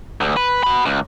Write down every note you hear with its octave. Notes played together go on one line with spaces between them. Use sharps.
D2
B4
F#4 B5
C#2